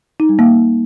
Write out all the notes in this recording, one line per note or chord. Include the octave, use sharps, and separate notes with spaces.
D#4
G3
A#3